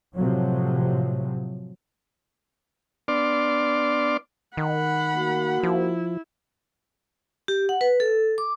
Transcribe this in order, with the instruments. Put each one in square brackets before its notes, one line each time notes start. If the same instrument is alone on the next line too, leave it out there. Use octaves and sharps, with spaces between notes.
[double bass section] A2 C3 F3 F#3
[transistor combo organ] B3 D4 D5 C6 D6 F6
[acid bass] D#3 [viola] F#5 B5
[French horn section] A#3 F#4
[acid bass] F3 [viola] E4
[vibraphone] G4
F#5
B4
A4
D6